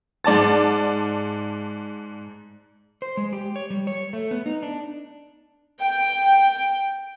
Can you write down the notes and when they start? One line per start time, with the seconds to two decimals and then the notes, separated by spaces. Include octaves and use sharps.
0.24 G#2 D5 A5 A6
3.02 C5
3.17 G#3
3.33 G4
3.56 C#5
3.70 G3
3.87 C#5
4.13 A3
4.31 B3
4.46 D#4
4.63 D4
5.81 G5